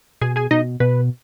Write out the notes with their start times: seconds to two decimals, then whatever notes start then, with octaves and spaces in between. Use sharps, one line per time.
0.21 B2 G#4 G#5
0.36 G#4 G#5
0.51 B2 D#4 D#5
0.80 B2 B4